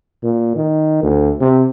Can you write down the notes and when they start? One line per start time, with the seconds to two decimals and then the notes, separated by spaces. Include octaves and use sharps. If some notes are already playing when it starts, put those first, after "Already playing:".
0.24 A#2
0.56 D#3
1.03 D2
1.41 C3